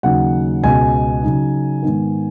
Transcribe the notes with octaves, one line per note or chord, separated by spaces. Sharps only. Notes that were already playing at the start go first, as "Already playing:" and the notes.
D#2 C#3 F#3 D#4 F#5
C#2 B2 G#3 G#5
C#3 F#3 D#4
G#2 D#3 B3